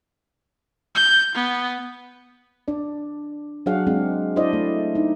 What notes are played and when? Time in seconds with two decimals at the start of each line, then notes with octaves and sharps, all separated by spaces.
0.95 G6
1.35 B3
2.68 D4 D5
3.66 F#3 D4 G#4 C#5 F5 F#5
3.87 G#3 C4 D4
4.36 D4 E4 C5 D5 D#5
4.53 A3
4.95 D#4